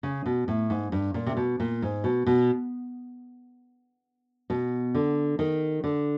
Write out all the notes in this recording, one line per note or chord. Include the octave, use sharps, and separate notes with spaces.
C#3
B2
A2
G#2
G2
A#2
C3
B2
A#2
G#2
B2
B2
B2
D3
D#3
D3